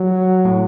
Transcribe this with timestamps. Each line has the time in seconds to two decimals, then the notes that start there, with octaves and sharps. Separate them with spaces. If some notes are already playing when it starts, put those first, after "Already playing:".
Already playing: F#3
0.45 A2